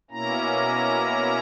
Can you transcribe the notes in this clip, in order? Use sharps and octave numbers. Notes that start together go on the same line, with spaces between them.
B2 A#3 C#4 E4 A#5